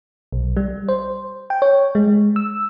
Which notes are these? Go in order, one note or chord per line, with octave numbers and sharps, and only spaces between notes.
B1
G3
C5
G5
C#5
G#3
E6